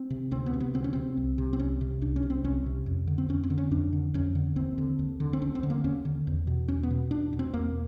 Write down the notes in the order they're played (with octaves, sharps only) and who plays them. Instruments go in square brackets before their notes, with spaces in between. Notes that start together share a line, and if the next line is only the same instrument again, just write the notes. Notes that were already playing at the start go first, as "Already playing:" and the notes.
Already playing: [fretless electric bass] C4
C3
D2 C4
B3
C3
B3
D2 C4
C#4
C3 C4
C2
C3
C4
C2 C#4
C3
C2 D4
C#4
C3
C4
C2 C#4
C3
F2
D3
C4
F2 C#4
C4
D3
C#4
F2 D4
D3
F2 C#4
D3
D#2 C4
D3
D#2
D3
C4
D#2 C#4
C4
D3
A#3
D#2 C#4
D3
E2
B2
E2 C#4
B3
B2
E2 D4
B2
C4
E2 A#3